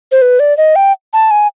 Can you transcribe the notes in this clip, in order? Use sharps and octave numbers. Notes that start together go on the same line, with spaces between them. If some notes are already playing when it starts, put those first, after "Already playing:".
C5
B4
D5
D#5
G5
A5
G#5